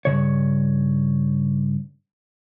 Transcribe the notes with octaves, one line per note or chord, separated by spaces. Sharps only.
G2 C#3 C#5